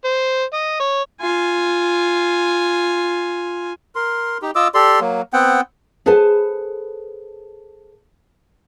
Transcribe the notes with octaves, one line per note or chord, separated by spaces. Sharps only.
C5
D#5
C#5
F4 G#5
A#4 C6
D#4 G4
F4 D#5 D6 E6
G4 A4 D5 C6
F#3 A#3
B3 C4 F#5 G5
G#4 A4 B4 C5 G#5 A5